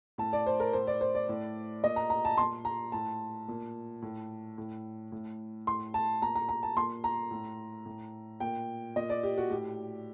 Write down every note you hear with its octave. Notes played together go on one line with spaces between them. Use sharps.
A2 A5
D5
C5
A#4
A2 C5
D5
C5
D5
A2
A#2 D#5
A#5
A#5
A5
A#2 C6
A#5
A2 A5
A#2
A2
A2
A2
A2 C6
A5
A#2 A#5
A#5
A#5
A5
A#2 C6
A#5
A2
A2
A#2 G5
A#2 D#5
D5
G4
F#4
A2 G4